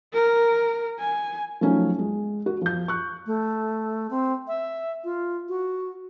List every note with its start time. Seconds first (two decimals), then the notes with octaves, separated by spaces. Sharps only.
0.13 A#4
0.99 G#5
1.61 F3 F#3 A3 C#4 D#4
1.99 G#3
2.46 F#4
2.62 F3 G6
2.88 C#6 F#6
3.26 A3
4.11 C4
4.48 E5
5.04 F4
5.49 F#4